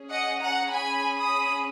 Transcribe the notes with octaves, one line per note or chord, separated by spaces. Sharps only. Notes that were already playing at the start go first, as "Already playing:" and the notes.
Already playing: C#4 G#4
D#5 F#5
F#5 A#5
G#5 B5
B5 D#6